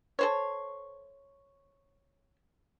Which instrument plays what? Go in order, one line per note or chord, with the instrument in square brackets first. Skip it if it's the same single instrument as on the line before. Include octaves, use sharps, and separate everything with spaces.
[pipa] A4 C5 C#5